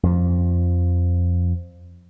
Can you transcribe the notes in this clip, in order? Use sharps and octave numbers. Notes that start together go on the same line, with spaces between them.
F2 F3